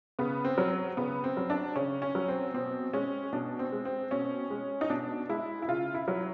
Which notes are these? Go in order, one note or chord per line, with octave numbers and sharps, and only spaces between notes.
C#3 B3
C4
F#3
C#3 B3
C4
F#3
D4
C#3 C#4
C#4
F#3
C4
B2 C4
G#3 C#4
B2 D4
C4
G#3
C4
B2 C#4
G#3
D#4
B2 D4
G#3 E4
E4
C#3 F4
E4
F#3